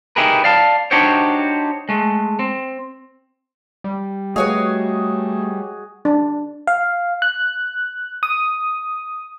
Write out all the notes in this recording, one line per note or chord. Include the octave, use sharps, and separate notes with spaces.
D#4 E4 G4 G#4 A#4 B4
D5 F5 A5
D4 D#4 F#4 G4 C5 C#5
G#3 A3
C4
G3
A3 F#4 G#4 B4 C#5 D#5 F5
D4
F5
F#6
D#6